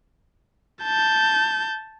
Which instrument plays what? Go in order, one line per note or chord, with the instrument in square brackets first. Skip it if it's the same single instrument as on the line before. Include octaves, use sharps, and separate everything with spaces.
[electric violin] A5 G6